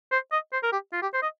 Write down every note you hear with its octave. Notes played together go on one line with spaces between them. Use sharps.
C5
D#5
C5
A#4
G4
F4
G4
C5
D#5